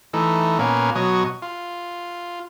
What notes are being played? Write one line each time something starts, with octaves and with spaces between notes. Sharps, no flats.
E3 A3 D#4
A#2 A#3 B3 C#4
B2 F#3 C#5 D#5
F4